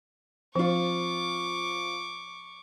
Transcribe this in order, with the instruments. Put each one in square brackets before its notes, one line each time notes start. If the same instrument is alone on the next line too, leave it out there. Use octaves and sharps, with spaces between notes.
[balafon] F3 [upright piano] C4 F4 [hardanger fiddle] C#6 D6